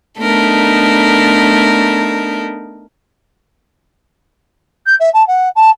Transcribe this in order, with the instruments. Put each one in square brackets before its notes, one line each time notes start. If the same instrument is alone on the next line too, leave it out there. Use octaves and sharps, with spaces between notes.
[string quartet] A3 B3 D4 D#4 A4 A#4
[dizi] G6
E5
A5
F#5
A5